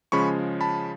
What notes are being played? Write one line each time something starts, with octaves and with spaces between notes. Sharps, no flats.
C#3 F3 G#3 C#4 B5 C#6
A5 B5